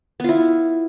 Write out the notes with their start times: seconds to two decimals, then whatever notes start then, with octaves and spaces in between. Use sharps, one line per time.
0.20 B3
0.24 F4
0.29 E4